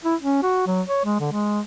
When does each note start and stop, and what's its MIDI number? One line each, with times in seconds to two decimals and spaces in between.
0.05 0.15 64
0.22 0.43 61
0.43 0.63 66
0.67 0.81 54
0.88 1.01 73
1.05 1.18 56
1.20 1.27 50
1.32 1.60 56